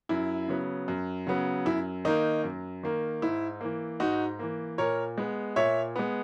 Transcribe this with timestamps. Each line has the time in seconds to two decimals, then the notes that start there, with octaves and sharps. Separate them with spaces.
0.09 F#2 E4
0.48 C#3 F#3 B3
0.88 F#2
1.27 C#3 F#3 B3
1.66 F#2 E4
2.05 D#3 A#3 D#4
2.44 F#2
2.83 D#3 A#3
3.22 G#2 E4
3.61 E3 A#3
4.00 G#2 D#4 F#4
4.39 E3 A#3
4.78 A#2 A#4 C#5
5.18 G#3 B3
5.56 A#2 C#5 E5
5.96 G#3 B3